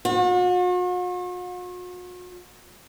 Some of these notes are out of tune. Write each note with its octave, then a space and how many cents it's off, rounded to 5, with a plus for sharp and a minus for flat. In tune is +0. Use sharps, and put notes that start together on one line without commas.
F#4 -45